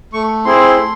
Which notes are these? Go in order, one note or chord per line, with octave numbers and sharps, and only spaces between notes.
A3 C#6
C4 E4 G#4 C6
A3